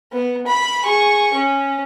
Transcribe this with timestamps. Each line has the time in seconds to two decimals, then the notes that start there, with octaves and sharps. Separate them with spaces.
0.12 B3
0.47 B5
0.84 G#4 C#6
1.35 C#4